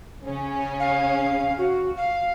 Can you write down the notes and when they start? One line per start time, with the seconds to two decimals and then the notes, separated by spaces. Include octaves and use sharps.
0.25 C#3 C#4
0.80 F5
1.58 F#4
1.97 F5